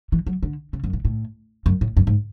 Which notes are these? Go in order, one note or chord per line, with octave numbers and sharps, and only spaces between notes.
E3
F#3
D3
C#3
F#2
A2
A2
F#2
A2
F#2
G#2